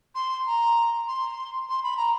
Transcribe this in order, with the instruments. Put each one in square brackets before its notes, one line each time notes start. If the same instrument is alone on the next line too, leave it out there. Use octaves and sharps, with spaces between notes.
[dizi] C6
A#5
C6
C6
B5
A#5